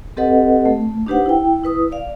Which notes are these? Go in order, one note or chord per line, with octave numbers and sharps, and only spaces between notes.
C4 G4 A4 B4 D#5 F#5
A3
D4 D#4 G4 B4 C5 F#5
E4 G5
E4 B4 D#6
D5 F5